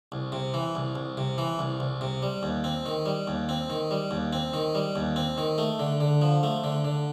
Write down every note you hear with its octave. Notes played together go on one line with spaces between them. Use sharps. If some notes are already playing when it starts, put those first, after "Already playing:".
C2
C3
E3
C2
C2
C3
E3
C2
C2
C3
G3
D#2
C4
D#3
G3
D#2
C4
D#3
G3
D#2
C4
D#3
G3
D#2
C4
D#3
A3
D3
D3
F3
A3
D3
D3